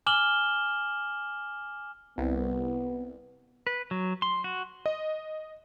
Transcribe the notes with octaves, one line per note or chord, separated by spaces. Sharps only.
G#5 D6 F6 E7 F#7 G7
C2 B3
B4
F#3
C6
F#4
D#5